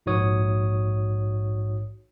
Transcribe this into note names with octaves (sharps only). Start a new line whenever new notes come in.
A#1 G#2 D#4 F#4 C#5 D#6